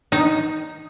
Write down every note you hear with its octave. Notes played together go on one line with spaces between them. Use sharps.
D#4